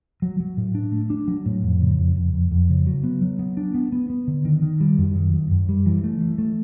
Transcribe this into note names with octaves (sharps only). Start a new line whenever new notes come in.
F#3
F#3
A2
D4
A3
D4
F#3
A2
F2
C#3
F2
F2
F2
F2
C#3
F#3
B3
F#3
B3
D4
B3
B3
B3
D3
D#3
D#3
G3
F#2
D#3
F#2
F#2
G3
E3
A3
E3
A3